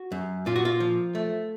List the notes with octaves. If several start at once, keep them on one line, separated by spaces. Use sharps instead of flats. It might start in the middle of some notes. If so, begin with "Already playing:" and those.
Already playing: F#4
F#2
A#2 F4
F#4
F4
F3
A3